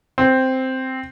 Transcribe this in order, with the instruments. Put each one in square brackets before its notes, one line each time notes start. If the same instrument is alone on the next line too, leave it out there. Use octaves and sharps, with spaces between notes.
[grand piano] C4